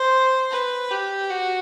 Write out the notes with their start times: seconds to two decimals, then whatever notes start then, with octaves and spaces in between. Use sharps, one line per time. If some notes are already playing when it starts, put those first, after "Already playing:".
Already playing: C5
0.51 B4
0.90 G4
1.30 F#4